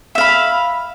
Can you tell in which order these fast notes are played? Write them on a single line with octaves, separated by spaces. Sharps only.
E5 F5 B5